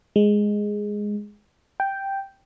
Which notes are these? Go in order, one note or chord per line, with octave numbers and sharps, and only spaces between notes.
G#3
G5